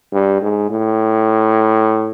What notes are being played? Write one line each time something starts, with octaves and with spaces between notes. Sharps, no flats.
G2
G#2
A2